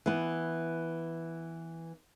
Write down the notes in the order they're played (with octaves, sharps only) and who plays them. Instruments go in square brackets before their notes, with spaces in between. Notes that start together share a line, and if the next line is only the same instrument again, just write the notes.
[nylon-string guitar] E3 B3